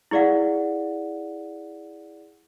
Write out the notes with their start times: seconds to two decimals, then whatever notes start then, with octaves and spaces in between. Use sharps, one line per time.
0.11 E4 G#4 D5 F5 F#5